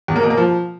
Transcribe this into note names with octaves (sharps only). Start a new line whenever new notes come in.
E2
A#3
B2
A#3
F3